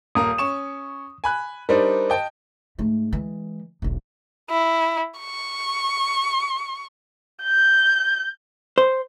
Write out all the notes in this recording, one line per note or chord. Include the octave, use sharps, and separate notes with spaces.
D#1 A#3 A#5 D#6
C#4 C#6 E7
G#5 B5 F#6
G3 D4 D#4 A#4 C5
D#5 G5 A5
G#2 A3
E3 G#3
E1 B1
E4
C#6
G6
C5